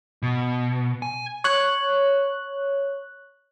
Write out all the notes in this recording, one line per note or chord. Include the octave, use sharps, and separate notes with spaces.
B2
G#5
C#5 F#6